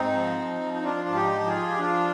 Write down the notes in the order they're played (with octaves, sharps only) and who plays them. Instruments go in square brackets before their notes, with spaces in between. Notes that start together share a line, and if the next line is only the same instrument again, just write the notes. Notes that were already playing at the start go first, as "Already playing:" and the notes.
Already playing: [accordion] G#2 C4 D#4
F3
F3
F3
D#4
F3 D4 F4
G#2
D#4 G4
F3
F4 G#4
F3
G4
F3 D4 F4